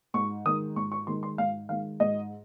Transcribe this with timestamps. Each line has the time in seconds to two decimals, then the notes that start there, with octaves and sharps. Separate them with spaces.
0.14 G#2 C#6
0.45 D#3 G#3 D#6
0.76 G#2 C#6
0.92 C#6
1.07 D#3 G#3 C6
1.23 C6
1.38 G#2 F5
1.69 D#3 G#3 F5
2.00 G#2 D#5